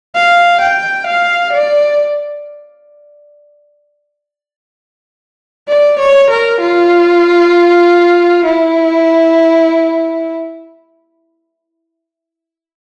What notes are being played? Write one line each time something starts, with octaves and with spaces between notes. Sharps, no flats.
F5
G5
F5
D5
D5
C#5
A#4
F4
E4